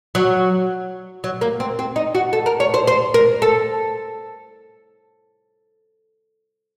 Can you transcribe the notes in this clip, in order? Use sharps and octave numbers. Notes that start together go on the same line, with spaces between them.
F#3
F#3
A#3
C4
C4
D#4
F#4
A4
A#4
C#5
C5
C5
A#4
A4